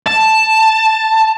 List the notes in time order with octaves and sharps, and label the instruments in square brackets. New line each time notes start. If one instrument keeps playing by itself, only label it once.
[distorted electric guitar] A5